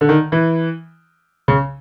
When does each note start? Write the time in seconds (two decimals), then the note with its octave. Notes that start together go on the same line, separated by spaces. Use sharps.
0.01 D3
0.09 D#3
0.32 E3
1.48 C#3